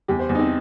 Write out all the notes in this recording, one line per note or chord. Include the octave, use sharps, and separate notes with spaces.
E2 G4
C5
E2
D#4
C4